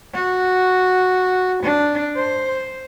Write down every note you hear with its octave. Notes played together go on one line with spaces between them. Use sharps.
F#4
D4
C5